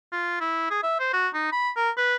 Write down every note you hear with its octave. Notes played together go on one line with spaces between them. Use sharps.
F4
E4
G#4
E5
C5
F#4
D#4
B5
A#4
B4